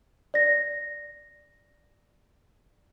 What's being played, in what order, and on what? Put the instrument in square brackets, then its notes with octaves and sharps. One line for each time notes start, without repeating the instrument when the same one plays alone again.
[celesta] D5 A#6